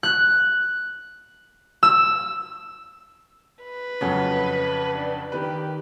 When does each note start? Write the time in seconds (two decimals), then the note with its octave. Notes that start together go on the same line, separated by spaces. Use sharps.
0.03 F#6
1.83 E6
3.63 B4
4.01 F2 C#3 F#3
4.98 D4
5.32 D#3 G4 B4